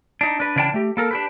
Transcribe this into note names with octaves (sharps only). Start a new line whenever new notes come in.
D4 D#4
D4 B4
C#3 E3 D4 D5 G5 A5
A3 G4
A#3 A4 A#4
D4 G4 B4